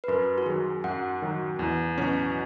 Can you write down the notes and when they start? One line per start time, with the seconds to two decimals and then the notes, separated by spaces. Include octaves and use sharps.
0.04 B4
0.08 F#2 A#4
0.38 F#4
0.46 D#3 F#3 G#4
0.84 F#2 F#5
1.22 D#3 F#3
1.59 E2
1.98 B2 F#3 C#4